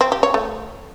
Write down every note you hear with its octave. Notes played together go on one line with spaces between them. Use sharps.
C4
G4
C#5
A3